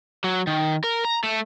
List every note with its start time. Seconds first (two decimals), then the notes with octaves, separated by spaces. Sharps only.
0.24 F#3
0.47 D#3
0.84 A#4
1.05 A#5
1.24 A3